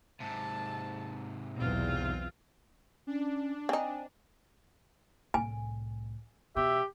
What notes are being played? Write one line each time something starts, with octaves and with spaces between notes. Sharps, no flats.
G#2 C3 A5
B1 E2 C4 F4
C#4 D4
C4 D#4 G#5
C2 A2 G#5
E2 B2 G4 E5